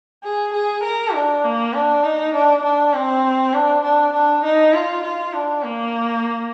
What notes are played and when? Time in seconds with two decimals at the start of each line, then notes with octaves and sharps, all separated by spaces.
0.24 G#4
0.53 G#4
0.84 A#4
1.14 D4
1.44 A#3
1.74 D4
2.03 D#4
2.34 D4
2.64 D4
2.94 C4
3.54 D4
3.84 D4
4.13 D4
4.44 D#4
4.74 F4
5.04 F4
5.33 D4
5.63 A#3